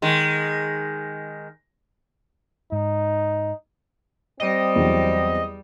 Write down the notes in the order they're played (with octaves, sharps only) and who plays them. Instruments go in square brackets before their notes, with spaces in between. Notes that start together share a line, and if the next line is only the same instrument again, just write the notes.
[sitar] D#3 G#3
[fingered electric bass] G#2 [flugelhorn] D#4
[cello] G3 [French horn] C4 [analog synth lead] D#5
[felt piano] E2 F#3